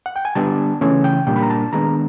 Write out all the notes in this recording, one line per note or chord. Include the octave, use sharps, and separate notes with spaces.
F#5
G5
G#5
D3 G3 B3 D4 A5
C#3 E3 A3 C#4 G#5
G5
A#2 G3 A#3 D4 G5
B5
A#5
A5
D#3 G#3 B3 D4 A#5